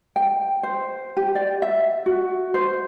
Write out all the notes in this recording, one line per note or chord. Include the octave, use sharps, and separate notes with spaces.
G5
C5
G4
D5
E5
F#4
C5